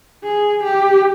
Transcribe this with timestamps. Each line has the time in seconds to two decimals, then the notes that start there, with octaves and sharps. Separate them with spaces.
0.24 G#4
0.64 G4